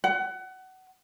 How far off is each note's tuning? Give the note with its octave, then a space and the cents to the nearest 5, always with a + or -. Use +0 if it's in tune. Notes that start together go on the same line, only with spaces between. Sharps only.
F#5 +25